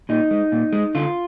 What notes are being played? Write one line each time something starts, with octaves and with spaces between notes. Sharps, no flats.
A#2 D#4
G#3
A#2
G#3
D3 F4